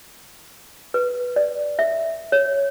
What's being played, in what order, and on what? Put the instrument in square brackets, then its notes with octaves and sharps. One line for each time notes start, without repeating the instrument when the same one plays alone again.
[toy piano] B4
D5
E5
C#5